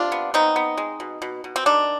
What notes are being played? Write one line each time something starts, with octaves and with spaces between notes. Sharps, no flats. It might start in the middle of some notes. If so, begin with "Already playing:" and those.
Already playing: C3 D4 F4
B3
B3 C4 D#4
B3
G#3
B2
B2
B2
C4
D#3 D4